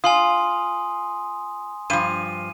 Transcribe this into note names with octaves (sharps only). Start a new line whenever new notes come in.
F4 G#5 C6 D#6
G2 F3 D#7